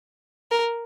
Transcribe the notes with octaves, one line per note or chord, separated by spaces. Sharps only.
A#4